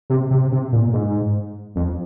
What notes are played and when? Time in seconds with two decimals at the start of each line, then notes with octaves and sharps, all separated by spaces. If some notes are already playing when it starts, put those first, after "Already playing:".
0.10 C3
0.31 C3
0.52 C3
0.72 A#2
0.93 G#2
1.76 F2